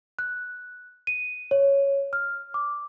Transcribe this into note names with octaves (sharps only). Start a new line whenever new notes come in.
F#6
D#7
C#5
F6
D6